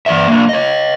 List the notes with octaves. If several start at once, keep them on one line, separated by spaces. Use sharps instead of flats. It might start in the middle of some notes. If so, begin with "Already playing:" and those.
E3 D5 E5
A#3 D4
C#5 D#5